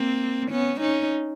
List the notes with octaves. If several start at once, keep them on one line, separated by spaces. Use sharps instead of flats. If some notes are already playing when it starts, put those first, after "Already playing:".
Already playing: A#3 C4
B3 C#4
C#4 D#4